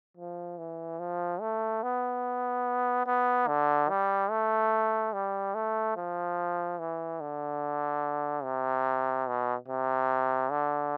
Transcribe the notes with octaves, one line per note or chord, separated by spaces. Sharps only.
F3
E3
F3
A3
B3
B3
D3
G3
A3
G3
A3
F3
E3
D3
C3
B2
C3
D3